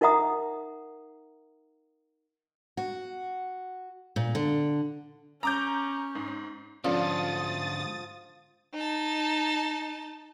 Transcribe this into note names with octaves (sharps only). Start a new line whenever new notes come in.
D#4 A#4 E5 F#5 A#5 D#6
F#4
A#2
D3
C#4 A#5 D6 G6
G#2
G#2 D3 F3 C#4 D4 A4 D#6 A6
D#4 A5